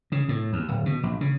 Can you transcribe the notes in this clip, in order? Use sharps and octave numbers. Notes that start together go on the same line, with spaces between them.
C#3
A2
D#2
D1
B2
A#1
C#3